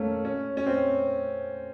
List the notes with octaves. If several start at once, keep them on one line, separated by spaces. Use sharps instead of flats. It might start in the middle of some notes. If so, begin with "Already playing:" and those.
Already playing: A3 A#3 C#4
C#4
C#4
C4